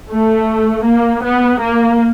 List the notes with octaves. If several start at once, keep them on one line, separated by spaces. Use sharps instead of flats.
A3
A#3
B3
A#3